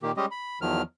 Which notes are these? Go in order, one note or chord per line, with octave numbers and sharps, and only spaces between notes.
A#2 D#3 A#3 G4
G3 G#3 C#4 G4 D#5
B5
E2 D#3 F3 F#3 F6